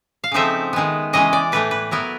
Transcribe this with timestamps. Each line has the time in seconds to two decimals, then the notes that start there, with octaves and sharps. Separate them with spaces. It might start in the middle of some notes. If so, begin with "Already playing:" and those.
0.24 F5
0.32 C#3 F3 A3 C4 D#4 E5
0.73 D#3 G#3 B3
1.13 C#3 E3 G#3 C#4 D#5
1.33 D5
1.52 A2 E3 A3 B4
1.71 B4
1.91 F#3 B3 E4 A#4